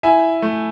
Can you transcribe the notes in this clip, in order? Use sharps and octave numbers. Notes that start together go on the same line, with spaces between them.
E4 E5 G#5
A3